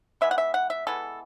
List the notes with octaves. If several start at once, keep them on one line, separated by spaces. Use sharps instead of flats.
E3 G#3 B3 E5
F#5
E5
F#5
E5
E3 G#3 B3 A4